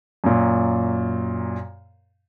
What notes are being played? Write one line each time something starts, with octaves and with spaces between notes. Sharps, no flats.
F#2 A#2